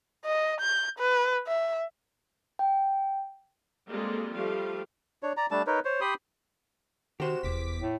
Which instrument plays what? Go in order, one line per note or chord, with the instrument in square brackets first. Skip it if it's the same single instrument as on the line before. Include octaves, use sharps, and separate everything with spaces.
[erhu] D#5
G6
B4
E5
[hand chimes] G5
[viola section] G3 G#3 A#3 C4 F4 A4
F3 G3 A3 F5
[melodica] D4 C#5
D5 A#5
G3 A3 D4 A5
D#4 A#4 B4 C#5
C5 C#5
G4 B5 C6 D#6
[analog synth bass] D#3 [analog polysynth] F#4 E7 [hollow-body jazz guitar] G4 C5
[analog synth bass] F1 [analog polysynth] E2 D6 B6
[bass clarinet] A2